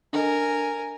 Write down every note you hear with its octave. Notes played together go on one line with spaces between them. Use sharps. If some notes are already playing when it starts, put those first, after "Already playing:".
D4 A4 A#4 D#5 G#5